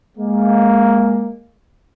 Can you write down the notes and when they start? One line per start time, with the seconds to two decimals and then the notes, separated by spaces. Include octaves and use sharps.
0.18 G#3 A#3